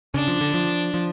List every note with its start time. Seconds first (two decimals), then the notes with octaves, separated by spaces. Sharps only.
0.14 C#3 D4
0.27 F3
0.41 D3
0.54 F3
0.94 F3